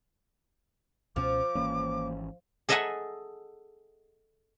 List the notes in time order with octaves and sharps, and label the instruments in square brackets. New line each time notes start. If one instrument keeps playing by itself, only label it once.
[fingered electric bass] C#2 B2 C#4 [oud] F3 [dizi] D6
[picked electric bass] G#1 E3 C#4 [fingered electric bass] A#3
[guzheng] G#4 A4 D#5 E5 F#5 G#5